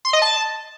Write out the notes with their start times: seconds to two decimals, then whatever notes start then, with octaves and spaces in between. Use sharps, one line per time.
0.05 C6
0.13 D#5
0.22 A5